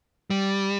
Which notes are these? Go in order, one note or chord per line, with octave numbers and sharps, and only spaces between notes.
G3